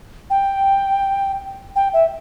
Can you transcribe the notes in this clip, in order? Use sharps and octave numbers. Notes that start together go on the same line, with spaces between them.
G5
G5
E5